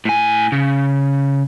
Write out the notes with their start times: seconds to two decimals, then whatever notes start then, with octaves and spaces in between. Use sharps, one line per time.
0.05 A2 G#5
0.52 C#3